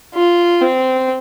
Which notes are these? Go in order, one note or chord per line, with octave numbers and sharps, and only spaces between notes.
F4
C4